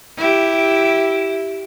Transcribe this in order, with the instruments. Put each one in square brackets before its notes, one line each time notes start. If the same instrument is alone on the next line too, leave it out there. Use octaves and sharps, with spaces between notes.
[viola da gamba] E4 G4